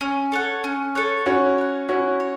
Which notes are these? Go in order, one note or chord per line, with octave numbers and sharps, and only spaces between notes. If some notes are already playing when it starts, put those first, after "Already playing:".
C#4
A4 C#5 F#5
C#4
A4 C#5 F#5
C#4 E4 F#4
C#5 F#5
C#4 E4 F#4
C#5